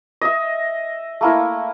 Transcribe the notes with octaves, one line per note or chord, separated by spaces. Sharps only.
D#5 E5
A3 A#3 E4